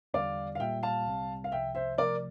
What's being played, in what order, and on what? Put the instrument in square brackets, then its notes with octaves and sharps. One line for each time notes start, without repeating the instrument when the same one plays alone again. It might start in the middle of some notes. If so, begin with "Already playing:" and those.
[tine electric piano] E2 D3 G3 [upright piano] D5 F5
[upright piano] F5
[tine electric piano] A#2 G3 A#3 F4 [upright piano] E5 G5
[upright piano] F5 A5
[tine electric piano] C2 C3 G3 C4
[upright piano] F5
[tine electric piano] C2 C3 F3 [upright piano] E5 G5
[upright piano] C5 E5
[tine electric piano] C3 F3 A3 [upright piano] A#4 D5